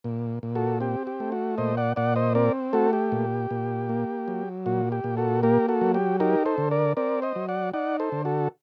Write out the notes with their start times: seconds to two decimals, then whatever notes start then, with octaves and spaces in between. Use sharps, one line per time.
0.04 A#2
0.43 A#2
0.55 F#4 A4
0.81 C4 G4
1.07 G4
1.20 A3
1.32 F#4
1.58 A#2 C5 D#5
1.77 D5 F#5
1.96 A#2 D5 F#5
2.16 C5 D#5
2.35 C4 A#4 D5
2.73 A3 F#4 A4
2.93 G4
3.12 A#2
3.51 A#2
3.89 A#3
4.28 F#3
4.66 A#2 F#4
4.92 G4
5.04 A#2
5.17 F#4 A4
5.43 A#3 G4 A#4
5.68 F#4 A4
5.81 F#3
5.94 G4
6.20 D#4 G4 A#4
6.46 A4 C5
6.58 D3
6.71 A#4 D5
6.97 C4 A#4 D5
7.22 C5 D#5
7.36 F#3
7.49 D5 F#5
7.73 D#4 D5 F#5
8.00 A4 C5
8.12 D3
8.25 F#4 A4